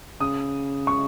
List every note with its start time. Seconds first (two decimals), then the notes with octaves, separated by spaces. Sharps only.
0.20 C#3 D#6
0.87 C#6